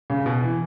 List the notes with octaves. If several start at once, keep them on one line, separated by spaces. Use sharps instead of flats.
C#3
B2
E3